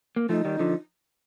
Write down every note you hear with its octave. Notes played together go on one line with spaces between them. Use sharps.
A#3
F3 A3 D#4
D#3 G3
D3 F3